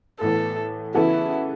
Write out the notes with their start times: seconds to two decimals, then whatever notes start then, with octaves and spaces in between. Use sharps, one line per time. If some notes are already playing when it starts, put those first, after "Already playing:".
0.21 A2 E3 B3 A4
0.94 C#3 E3 B3 E4 F#4 A4